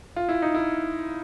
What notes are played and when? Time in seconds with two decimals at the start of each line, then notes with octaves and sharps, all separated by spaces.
0.16 F4
0.29 E4
0.42 D#4
0.55 E4